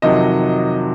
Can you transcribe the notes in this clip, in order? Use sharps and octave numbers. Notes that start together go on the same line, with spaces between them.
F2 C3 D#3 F#3 D#5